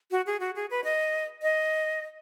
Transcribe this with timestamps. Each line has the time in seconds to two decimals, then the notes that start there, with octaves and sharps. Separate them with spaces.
0.11 F#4
0.27 G#4
0.40 F#4
0.56 G#4
0.70 B4
0.84 D#5
1.42 D#5